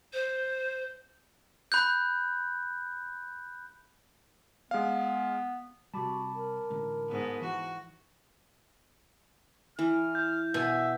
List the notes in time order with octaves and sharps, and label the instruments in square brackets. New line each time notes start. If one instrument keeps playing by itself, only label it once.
[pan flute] C5
[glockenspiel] B5 F#6 G6
[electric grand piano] G#3 F5 [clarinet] B3
[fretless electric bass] C3 G3 [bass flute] F#4 [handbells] A5 B5 D6
[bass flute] A#4
[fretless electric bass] A1 D3 G#3
[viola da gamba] G#2 B3
[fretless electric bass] E3 [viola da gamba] F#4
[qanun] E3 [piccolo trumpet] F6
[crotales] G6
[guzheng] B2 [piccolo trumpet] E5 [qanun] G#5